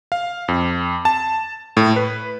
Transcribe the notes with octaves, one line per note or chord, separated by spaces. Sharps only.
F5
F2
A5
A2
B4